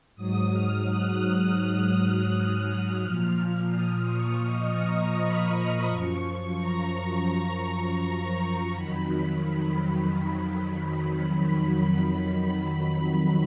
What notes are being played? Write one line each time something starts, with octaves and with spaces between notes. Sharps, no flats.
G#2 F#3 D#6
F6
F#6
F6
A#2 F3 F6
F6
D#6
C#6
D#5
A#5
B5
F#2 F3 C#6
A#5
F2 D#3 F#3 B5
B5